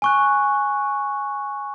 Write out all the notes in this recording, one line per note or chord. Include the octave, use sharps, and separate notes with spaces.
G#5 C#6 F#6